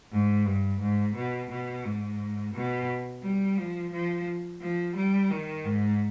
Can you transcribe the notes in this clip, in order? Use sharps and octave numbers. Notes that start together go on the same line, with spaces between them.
G#2
G2
G#2
B2
B2
G#2
B2
G3
F3
F3
F3
G3
D#3
G#2